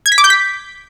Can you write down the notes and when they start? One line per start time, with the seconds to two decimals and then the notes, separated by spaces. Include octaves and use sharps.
0.06 G#6
0.12 B6
0.18 D6
0.24 G6
0.30 B6